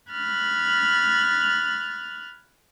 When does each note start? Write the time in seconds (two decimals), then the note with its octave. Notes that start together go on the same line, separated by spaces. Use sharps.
0.11 B5 F6 F#6 G#6 A6